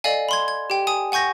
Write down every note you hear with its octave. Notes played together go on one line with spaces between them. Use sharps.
A4 D5 D#5 F5 G#5
B5 C6 G#6
G#6
G4 G5
G#5 D#6
F#5 G#5 C#6 G6 A#6